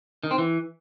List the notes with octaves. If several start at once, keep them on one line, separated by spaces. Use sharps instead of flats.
D#3
C4
E3